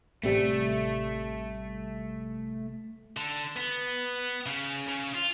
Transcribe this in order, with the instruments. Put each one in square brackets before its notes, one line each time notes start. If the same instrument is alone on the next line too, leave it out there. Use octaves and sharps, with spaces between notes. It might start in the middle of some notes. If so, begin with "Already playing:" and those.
[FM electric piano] A1 C3 G3 [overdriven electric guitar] A3
[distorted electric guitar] D3
B3
C#3
C#3
F4